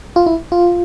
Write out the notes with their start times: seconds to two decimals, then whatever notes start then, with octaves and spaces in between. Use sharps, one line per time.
0.16 F4
0.26 E4
0.52 F4